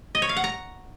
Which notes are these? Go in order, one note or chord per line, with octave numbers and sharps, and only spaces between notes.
D#5
C#5
F5
F#5
A#5